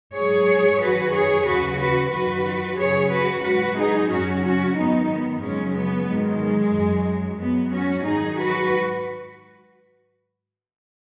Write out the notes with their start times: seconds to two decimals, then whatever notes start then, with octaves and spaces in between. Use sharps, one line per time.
0.15 G#2 F#3 G#4 C#5
0.81 F#2 D#3 F#3 F#4 B4
1.14 G#4 C#5
1.46 D#2 C#3 F#3 F#4 B4
1.79 F#4 B4
2.12 F#2 D#3 F#3 F#4 B4
2.78 F#2 C#3 F#3 G#4 C#5
3.11 F#4 B4
3.44 G#2 F#3 F#4 B4
3.77 D#4 G#4
4.10 F#2 C#3 F#3 C#4 F#4
4.43 C#4 F#4
4.76 G#2 D#3 F#3 B3 D#4
5.08 B3
5.42 F#2 C#3 F#3 G#3 C#4
5.75 B3
6.08 G#2 D#3 F#3 G#3
6.74 F#2 F#3
7.40 F#2 F#3 B3
7.72 C#4 F#4
8.05 G#2 D#3 F#3 D#4 G#4
8.38 F#4 B4